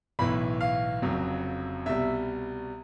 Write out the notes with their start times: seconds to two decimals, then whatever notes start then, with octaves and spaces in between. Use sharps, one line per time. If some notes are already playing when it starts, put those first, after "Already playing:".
0.19 B1 A2 E3 B5
0.61 F5
1.02 F1 F2 C#3 F#3
1.86 C2 B2 G3 E5